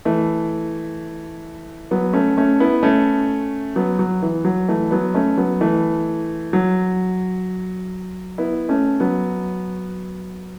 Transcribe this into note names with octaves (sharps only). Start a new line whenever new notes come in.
E3 A3
F#3 B3
A3 C#4
A3 C#4
B3 E4
A3 C#4
F#3 B3
F#3
E3
F#3
E3 A3
F#3 B3
A3 C#4
F#3 B3
E3 A3
F#3
B3 E4
A3 C#4
F#3 B3